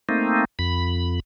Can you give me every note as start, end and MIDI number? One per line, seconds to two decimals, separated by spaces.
0.09 0.45 57
0.09 0.45 58
0.09 0.45 60
0.09 0.45 63
0.59 1.20 41
0.59 1.20 83